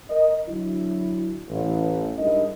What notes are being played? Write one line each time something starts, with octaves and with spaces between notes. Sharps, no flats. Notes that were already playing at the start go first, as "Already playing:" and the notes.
A#4 D#5
D3 F#3 D4 E4
A1
G#2 G3 D4 E4 A#4 D#5